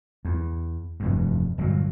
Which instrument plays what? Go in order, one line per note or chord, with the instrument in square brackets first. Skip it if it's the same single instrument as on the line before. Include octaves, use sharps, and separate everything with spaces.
[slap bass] E2
F1 E2 G2
G1 A#2 D3 F#3